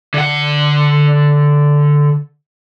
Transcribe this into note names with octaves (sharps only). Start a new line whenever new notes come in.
D3 F#5